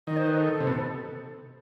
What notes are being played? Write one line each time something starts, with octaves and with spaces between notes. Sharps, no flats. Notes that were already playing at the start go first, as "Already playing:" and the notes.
D#3 D#5
C5
B4
A4
C3
B2